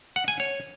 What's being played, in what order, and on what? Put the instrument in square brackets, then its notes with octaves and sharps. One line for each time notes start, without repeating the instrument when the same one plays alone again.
[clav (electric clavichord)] F#5
G#5
C#5